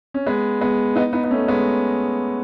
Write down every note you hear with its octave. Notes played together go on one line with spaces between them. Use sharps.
C#4
G#3 B3
G#3 B3
B3 D#4
B3 D#4
B3
A3 C#4
G#3 B3